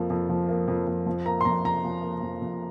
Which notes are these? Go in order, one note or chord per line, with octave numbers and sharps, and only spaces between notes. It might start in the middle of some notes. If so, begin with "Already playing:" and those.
Already playing: F2 F3 A#3
F2
F3
A#3
F2
F2
F3
A#3 A#5
C6
F2 A#5
F2 A#5
F3
A#3
F2
F2